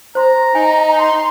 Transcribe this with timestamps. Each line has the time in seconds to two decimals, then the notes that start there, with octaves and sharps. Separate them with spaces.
0.15 C5 A#5 C6
0.55 D#4 G#5
0.99 C6